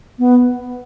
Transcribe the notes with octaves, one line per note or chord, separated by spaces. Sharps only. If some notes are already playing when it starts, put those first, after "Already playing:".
B3